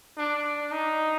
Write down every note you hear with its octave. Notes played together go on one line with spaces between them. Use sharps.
D4
D#4